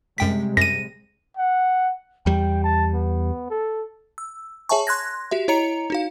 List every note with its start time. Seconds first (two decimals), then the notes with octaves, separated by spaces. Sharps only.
0.18 F#2 C3 G3 G#3 G5 B6
0.57 F#2 A#6 D#7
1.37 F#5
2.26 E2 G3 G5
2.64 A5
2.94 B3
3.50 A4
4.18 E6
4.69 G#4 C#5 E5 G#5 A5 C#6
4.87 C6 F#6 G#6 A#6
5.31 F#4 G4 E5
5.48 E4 C#5 D#5 A#5 C#7 F7
5.90 D#4 F#4 F5